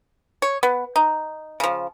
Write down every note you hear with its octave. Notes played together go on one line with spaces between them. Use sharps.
C#5
B3
D#4
C#3 F3